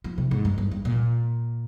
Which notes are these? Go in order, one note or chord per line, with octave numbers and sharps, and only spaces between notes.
F3
C3
G#2
G2
G2
G2
A#2